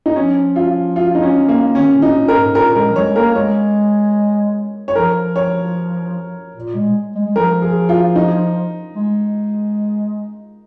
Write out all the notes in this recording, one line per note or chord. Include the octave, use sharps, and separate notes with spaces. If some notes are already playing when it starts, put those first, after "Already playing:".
D#4
F3 C#4
F4
F4
D#4
C#4
A#3
D#3 C#4
A#2
D#4
A#2
A#4
G#2
A#2 A#4
G#3 A#4
F3
G#3 C#5
A#3 A#4
G#3 C#5
C#5
F3 A#4
C#5
A#2
G#3
G#3
G#3
F3 A#4
G#4
F4
D#4
G#3